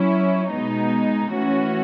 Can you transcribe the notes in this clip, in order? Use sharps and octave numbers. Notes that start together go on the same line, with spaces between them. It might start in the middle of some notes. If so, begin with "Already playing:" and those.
Already playing: F#3 C#4 E4
B2 G#3 B3 D#4
E3 A3 C#4 F#4